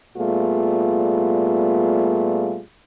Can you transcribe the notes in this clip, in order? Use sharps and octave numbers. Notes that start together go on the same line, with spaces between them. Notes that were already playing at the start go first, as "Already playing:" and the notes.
A#2 G3 A3 B3 F4 G#4